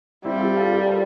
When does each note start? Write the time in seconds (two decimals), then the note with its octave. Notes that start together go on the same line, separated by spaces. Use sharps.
0.25 G3 C4 E4
0.36 F4
0.41 E4 G4
0.56 F4 A4
0.72 G4 A#4
0.88 A4 C5